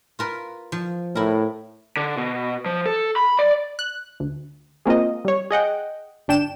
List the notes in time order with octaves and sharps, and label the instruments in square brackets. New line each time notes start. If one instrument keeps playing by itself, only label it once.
[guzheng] F4 A#4 B4
F3
[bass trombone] A2 [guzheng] E4 A#4
[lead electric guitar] D3
B2
F3
A4
B5
D5
[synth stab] F#6
D2
G#3 A#3 C4 F4 D#5
G3 C#5
G#4 D#5 F#5 G5
G1 D4 G5 E7